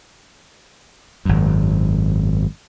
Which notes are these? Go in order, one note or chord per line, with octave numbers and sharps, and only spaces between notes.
G#1 F#2